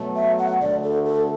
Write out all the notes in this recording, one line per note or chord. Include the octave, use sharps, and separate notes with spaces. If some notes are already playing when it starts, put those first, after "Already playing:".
Already playing: B2 F#3 A3
E5
F#5
D2 D3 A3 D5
A4
A4